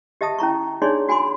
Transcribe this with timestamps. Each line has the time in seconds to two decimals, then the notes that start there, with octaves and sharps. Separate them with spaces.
0.21 G4 D#5 E5 A5 D#6
0.39 C#4 E4 A#5 C#6
0.82 D4 D#4 G#4 C#5 D5 C6
1.09 F#4 G#5 B5 C6 D6